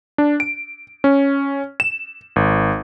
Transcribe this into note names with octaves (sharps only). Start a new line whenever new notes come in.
D4
D7
C#4
E7
G#1